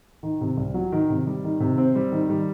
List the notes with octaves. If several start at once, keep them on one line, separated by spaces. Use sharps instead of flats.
D#3
C3
C2
F#3
D#3
C3
G3
D#3
C3
C4
G3
D#3
G3